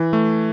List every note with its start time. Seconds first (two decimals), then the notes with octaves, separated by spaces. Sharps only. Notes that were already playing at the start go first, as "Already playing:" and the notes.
Already playing: E3
0.13 A3